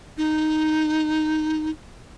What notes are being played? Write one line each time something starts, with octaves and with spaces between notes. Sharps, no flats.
D#4